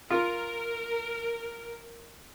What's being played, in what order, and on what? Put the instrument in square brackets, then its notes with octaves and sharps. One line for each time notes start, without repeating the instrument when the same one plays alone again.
[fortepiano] F4 [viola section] A#4